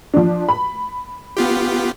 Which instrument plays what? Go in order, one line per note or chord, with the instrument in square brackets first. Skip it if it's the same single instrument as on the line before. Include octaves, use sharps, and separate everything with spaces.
[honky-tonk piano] F3 D4
B5
[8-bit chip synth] B3 F4 G4